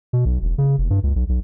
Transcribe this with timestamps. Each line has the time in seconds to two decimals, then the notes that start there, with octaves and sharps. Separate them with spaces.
0.13 B2
0.25 B1
0.43 E1
0.58 C#3
0.78 F1
0.90 G2
1.03 C#2
1.16 B1
1.29 B1